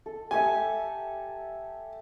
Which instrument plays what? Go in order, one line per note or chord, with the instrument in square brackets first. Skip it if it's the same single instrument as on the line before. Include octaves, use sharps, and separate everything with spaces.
[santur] A4
[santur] G4 A4 E5 [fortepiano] G#5